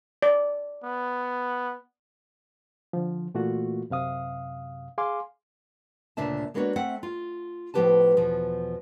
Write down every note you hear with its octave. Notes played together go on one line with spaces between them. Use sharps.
D5
B3
D3 F3
A#2 E3 A3 A#3 F4 F#4
F#2 C3 F5 D#6
G#4 F5 G#5 C6 D6
D2 A#2 C#3 D4 E5 A5
G#3 A#3 B3 D4 F#4 C#5
A3 C4 E5 F#5
F4
A2 F3 B3 G4 B4 A5
E2 B2 F3